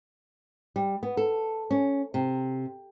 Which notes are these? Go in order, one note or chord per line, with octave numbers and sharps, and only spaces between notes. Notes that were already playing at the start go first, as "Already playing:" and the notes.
G3
B3
A4
C#4
C3